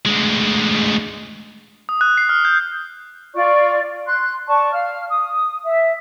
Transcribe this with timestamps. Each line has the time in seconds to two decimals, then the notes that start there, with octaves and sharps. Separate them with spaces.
0.06 D2 G#3
1.89 D#6
2.01 F#6
2.17 C7
2.29 F6
2.45 G6
3.34 F4 D5 C#6
4.06 C6 F#6
4.48 D5 A5 C#6
4.72 F5 F6
5.09 D#6
5.65 E5